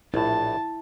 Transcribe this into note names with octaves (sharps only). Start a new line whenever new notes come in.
A#1 A2 E4 A5